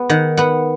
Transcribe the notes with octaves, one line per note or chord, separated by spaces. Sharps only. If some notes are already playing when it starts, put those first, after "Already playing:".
Already playing: B3
D#3 F#5
B3 F#5